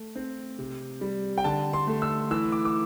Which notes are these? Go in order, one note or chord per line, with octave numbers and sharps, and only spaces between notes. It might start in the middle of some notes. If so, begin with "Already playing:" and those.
Already playing: A3
C4
C3
G3
G5
D3 A5
C6
A3
E6
E3 E6
D6
D6